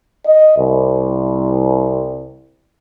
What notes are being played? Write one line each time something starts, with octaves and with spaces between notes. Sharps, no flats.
D#5
C2